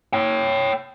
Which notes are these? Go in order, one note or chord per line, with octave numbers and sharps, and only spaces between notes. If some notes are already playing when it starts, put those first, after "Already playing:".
C#5 G5